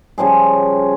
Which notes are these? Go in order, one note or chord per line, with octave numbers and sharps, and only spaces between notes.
C#3 F3 G3 G#4